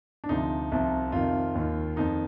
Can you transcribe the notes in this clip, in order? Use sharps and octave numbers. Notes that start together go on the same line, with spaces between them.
D4
D2 C3 F3 D#4
C2 C3 F3
F2 C3 D#3 F4
D#2 D#3
F2 D#3 D#4